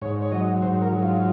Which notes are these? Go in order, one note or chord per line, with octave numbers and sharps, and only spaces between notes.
G#2 C#5
C#5
F#3 D#5
G#2 C5
A#4
F#3
F4